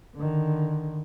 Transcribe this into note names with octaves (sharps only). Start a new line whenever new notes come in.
D3 D#3